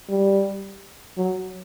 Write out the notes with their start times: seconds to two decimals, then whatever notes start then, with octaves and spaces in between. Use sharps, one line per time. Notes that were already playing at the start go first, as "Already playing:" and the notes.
0.09 G3
1.17 F#3